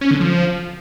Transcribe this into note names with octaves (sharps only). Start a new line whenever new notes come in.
C#4
D3
F3